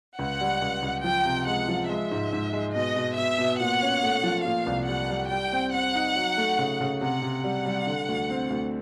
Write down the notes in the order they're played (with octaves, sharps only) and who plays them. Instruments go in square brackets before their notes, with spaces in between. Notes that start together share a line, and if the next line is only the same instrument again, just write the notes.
[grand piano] C#2 [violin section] F#5
[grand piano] G3
C#2
C#2
[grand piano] F3 [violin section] G5
[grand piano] C3
[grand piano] G#3 [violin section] F#5
[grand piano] F3
[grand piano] G#3 [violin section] E5
[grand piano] G#2
G#2
G#3
[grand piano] B2 [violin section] D#5
[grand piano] B2
[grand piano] B2 [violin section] E5
[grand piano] B2
[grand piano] A#2 [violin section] F#5
[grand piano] C#4
A3
F3
[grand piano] A#2 [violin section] F5
[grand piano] C2
[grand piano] G3 [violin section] F#5
[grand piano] G3
[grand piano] G3 [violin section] G5
[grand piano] C4
[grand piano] C4 [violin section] F#5
[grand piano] D#4
F#3
A3
C#3
C#3
[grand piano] C3 [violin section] F#5
[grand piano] C3
[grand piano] G3 [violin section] F#5
[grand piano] G3
D3
D2
C4
D2